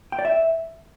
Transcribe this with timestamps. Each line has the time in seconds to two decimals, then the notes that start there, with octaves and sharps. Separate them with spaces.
0.12 G5
0.19 D5
0.25 E5